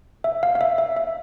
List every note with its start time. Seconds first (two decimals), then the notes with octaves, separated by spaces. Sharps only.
0.24 E5
0.43 F5
0.55 F5
0.61 E5
0.78 E5
0.96 E5